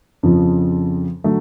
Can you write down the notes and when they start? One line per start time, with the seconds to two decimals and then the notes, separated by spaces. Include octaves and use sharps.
0.23 F2 C#3 F3
1.24 D3 F#3 A3